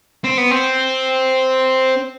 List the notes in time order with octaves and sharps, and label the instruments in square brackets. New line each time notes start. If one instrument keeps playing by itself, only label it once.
[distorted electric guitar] C4
B3
C4